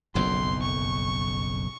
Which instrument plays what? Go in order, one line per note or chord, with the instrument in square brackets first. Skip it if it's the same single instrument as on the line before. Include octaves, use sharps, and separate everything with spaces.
[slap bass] F#1 B1 F2 [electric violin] C6
[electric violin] C#6